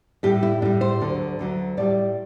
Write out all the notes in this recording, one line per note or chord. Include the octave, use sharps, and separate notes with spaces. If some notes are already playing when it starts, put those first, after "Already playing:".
A2 G3 G4
E4
A2 G3 D4
C5
D2 D3 F#3
D2 D3 F#3
A2 G3 D5